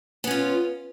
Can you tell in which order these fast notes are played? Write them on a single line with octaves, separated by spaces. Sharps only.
B3 C#4 F4